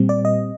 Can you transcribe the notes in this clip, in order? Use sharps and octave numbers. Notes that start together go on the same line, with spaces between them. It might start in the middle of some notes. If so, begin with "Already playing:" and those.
Already playing: A#2 G3 C4
D5
D#5